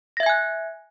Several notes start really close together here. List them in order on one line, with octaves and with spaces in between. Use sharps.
A#6 E5 G#6 G#5 F#6